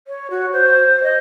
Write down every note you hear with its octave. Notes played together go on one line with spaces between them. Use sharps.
C#5
F#4
C5
D#5